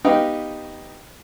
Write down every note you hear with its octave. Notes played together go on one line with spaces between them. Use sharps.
B3 D#4 G4 D#5 F5 G5